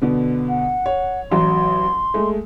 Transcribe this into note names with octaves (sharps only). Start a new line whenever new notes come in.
B2 D3 B3
F#5
C#5
A1 F#3 C6
G#3 A3